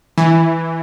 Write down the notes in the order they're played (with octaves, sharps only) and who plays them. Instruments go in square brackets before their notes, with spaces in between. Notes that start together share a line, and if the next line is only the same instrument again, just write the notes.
[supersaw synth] E3